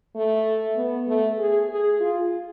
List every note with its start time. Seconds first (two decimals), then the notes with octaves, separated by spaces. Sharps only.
0.15 A3
0.76 B3
1.07 A3
1.38 G#4
1.69 G#4
2.00 F4